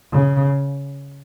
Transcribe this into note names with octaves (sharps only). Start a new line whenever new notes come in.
C#3